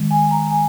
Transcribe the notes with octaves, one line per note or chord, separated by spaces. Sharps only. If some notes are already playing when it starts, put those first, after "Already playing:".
Already playing: D#3 G#3
G#5
A#5
G#5